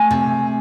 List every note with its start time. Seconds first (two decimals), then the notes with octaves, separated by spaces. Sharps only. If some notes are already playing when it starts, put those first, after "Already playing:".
Already playing: A3 G#5
0.11 C3